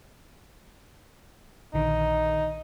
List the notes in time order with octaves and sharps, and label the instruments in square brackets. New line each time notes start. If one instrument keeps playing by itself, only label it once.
[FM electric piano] A#1 D3 D#3 [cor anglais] D#4